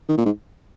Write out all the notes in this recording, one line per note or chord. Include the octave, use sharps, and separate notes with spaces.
D#3
A#2
G#2